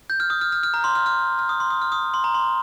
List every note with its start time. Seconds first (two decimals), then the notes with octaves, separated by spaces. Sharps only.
0.10 G6
0.20 F6
0.30 D#6
0.41 F6
0.52 F6
0.63 F6
0.74 A#5
0.84 C6
0.95 F6
1.06 F6
1.39 F6
1.49 D#6
1.60 C6
1.70 D#6
1.82 F6
1.92 D#6
2.14 C6
2.24 A#5
2.35 C6